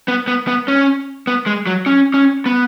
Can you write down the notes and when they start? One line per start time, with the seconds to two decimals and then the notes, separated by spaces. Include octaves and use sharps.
0.08 B3
0.28 B3
0.48 B3
0.68 C#4
1.27 B3
1.46 G#3
1.67 F#3
1.86 C#4
2.14 C#4
2.46 B3